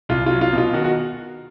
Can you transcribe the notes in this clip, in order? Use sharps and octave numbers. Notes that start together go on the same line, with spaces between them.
C2 F4
F#3 F4
F4
B2
F4
D#3 F#4
F#4